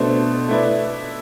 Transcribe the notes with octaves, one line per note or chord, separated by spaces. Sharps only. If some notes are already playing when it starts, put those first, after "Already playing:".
Already playing: B2 A3 D4 A4 C5
A3 E4 B4 D5